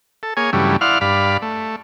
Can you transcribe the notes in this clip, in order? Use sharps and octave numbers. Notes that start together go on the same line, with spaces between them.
A4
A#3 G#4 C#5 G#5
G2 C#3 E3 F#3 G3 A3
E4 D5 F5 F#5 C6 F6
G2 D5 F5 B5
A3